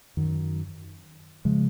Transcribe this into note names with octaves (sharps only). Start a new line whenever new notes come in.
F#2 D#3 F#3
C#3 F3 G#3